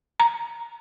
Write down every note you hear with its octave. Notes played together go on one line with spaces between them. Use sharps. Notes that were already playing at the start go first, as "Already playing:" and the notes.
A#5